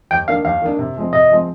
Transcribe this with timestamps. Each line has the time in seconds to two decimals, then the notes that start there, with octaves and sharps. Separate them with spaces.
0.11 D#2 G5
0.28 D#3 A#3 D4 F5
0.45 D#2 F5
0.62 D#3 A#3 D4
0.79 C3
0.96 F3 G#3 C4
1.13 C3 D#5
1.31 F3 G#3 C4